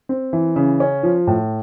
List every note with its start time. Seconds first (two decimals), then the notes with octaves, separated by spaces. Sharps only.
0.09 C4
0.33 E3
0.56 C#3
0.80 C#4
1.03 F3
1.27 A2